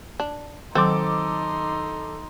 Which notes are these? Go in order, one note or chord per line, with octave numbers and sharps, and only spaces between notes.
D4
D#3 F#3 C4 D#4 A4 C6 D6